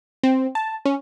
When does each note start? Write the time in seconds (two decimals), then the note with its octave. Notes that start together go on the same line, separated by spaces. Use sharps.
0.23 C4
0.55 A5
0.85 C#4